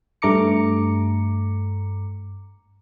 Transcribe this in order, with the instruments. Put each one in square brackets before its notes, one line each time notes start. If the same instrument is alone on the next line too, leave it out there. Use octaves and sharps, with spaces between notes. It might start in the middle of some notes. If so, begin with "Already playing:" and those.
[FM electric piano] G2 A3 A#5 D6 C#7